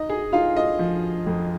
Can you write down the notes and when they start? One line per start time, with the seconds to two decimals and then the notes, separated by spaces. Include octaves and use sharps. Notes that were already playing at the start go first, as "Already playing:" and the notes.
Already playing: D#4 D#5
0.09 G#4 G#5
0.33 D#4 F4 F5
0.57 D#5
0.79 F3
1.27 F2